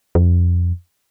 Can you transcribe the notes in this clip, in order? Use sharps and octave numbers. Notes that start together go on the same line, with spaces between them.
F2